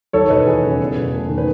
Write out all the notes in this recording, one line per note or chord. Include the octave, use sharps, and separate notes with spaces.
D#2 A4 C#5
E1 B4 D#5
E3 G#4
C#3
E2
E1
A3
D#3
B4